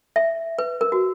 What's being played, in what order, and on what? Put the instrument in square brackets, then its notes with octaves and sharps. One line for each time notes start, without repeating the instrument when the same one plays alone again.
[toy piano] E5
B4
A#4
F#4